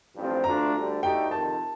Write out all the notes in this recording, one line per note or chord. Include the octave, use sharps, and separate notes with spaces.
A1 G2 F3 C4
D2 D3 A3 D4 F4 A#5
D2 D3 G3
D2 D3 A3 D#4 G4 G5
F2 C3 D#3 A5